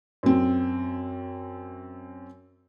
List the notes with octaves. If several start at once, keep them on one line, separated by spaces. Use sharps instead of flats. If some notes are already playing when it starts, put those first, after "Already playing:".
F#2 C4